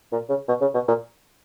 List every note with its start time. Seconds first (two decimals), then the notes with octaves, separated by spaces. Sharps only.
0.12 A#2
0.29 C#3
0.48 B2
0.61 C#3
0.74 B2
0.88 A#2